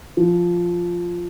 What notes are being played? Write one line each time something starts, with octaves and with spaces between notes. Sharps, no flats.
F3